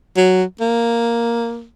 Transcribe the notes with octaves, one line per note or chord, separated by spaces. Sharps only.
F#3
A#3